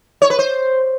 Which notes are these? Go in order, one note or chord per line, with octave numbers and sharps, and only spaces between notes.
C#5
B4
C5